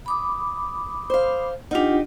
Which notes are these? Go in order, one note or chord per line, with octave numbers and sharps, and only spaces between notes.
B5 D6 D#6
C5 F5
D4 D#4 F4 G4 F#5